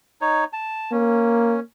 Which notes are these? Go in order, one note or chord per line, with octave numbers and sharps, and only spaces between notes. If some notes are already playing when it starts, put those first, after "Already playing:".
D#4 C#5
A5
A#3 C#4